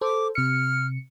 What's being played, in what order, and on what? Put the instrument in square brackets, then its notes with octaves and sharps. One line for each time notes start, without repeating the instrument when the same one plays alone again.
[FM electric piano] A4 C5 [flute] D6
[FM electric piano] C3 C#7 [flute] F6